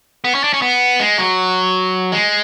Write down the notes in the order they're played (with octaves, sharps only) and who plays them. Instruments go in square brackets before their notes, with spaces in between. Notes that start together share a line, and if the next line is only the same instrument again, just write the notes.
[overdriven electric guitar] B3
C#4
D4
C#4
B3
G#3
F#3
G#3